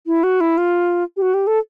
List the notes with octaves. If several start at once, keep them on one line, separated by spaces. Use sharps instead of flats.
E4
F#4
E4
F4
G4
F#4
G4
A4